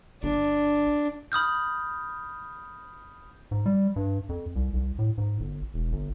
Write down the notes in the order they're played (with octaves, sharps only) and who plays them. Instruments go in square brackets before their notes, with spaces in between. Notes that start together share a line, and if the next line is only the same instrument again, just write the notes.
[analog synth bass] G1 [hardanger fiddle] D4
[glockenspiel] B5 D#6 F6 G6
[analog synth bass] G#2
G3
G2
F2
C2
C2
A2
G#2
G1
E1
G1